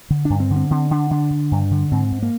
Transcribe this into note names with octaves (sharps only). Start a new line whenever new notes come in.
D3
G2 D4
C4
D3
C4
D3 C4
D3 D4
D3 D4
D3
G2
D3
G#2 C4
G#2
A#3